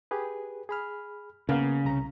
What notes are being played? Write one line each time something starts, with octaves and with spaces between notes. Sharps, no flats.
G4 G#4 B4
G#4 B5 F6
C#3 A#3 B3 F5
C2 A#5